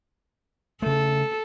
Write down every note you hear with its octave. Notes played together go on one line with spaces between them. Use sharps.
C#3 A3 A4